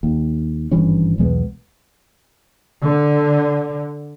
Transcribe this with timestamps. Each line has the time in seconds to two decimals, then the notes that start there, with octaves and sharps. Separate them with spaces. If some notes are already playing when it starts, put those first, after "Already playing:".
0.03 D#2
0.71 G#1 G2 E3 C#4
1.18 B1 E2 G#3 B3
2.81 D3